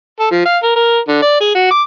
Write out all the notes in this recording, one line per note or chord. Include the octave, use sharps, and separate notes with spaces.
A4
F3
F5
A#4
A#4
D3
D5
G#4
F#4
D6